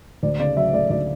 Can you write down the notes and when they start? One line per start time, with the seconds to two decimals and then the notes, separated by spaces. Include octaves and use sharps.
0.23 D2 D5
0.39 C#3 D5
0.57 F#3 E5
0.73 A3 D5
0.90 D2 D5